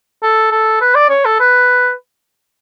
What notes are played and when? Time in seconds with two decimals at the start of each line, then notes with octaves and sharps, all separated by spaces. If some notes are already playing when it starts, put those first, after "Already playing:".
0.23 A4
0.51 A4
0.81 B4
0.95 D5
1.10 C#5
1.25 A4
1.40 B4